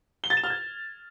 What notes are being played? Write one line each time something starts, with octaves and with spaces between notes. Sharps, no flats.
G7
A6
E7
F6
G#6